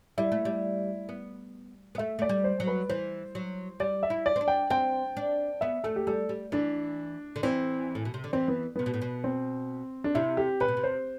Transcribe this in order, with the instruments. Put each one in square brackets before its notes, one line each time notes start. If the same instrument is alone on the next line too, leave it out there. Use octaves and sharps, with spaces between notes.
[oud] G3 [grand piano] E4
[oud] A3
G3
B3
B3
[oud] A3 [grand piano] E5
[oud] A3 [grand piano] D5
[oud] G3
[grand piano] C5
[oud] F#3
[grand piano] B4
[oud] E3 [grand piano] C5
[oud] F#3
[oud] G3 [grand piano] D5
[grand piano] E5
[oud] E4
[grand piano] D5
[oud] C4
D4
[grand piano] G5
[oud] C4 [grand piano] G5
[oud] D4
[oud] B3 [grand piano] E5
[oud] A3 [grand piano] A4
[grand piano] G4
[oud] G3 [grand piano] A4
[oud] G3
[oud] E3 [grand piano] D4
[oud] D3
[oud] E3 [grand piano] C4
[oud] A2
B2
C3
D3
[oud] E3 [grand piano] C4
[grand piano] B3
[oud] C3 [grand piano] B3
[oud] B2
A2
B2
[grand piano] C4
D4
[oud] C3 [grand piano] E4
[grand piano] G4
[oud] C3 [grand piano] B4
[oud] B2
C3
[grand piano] C5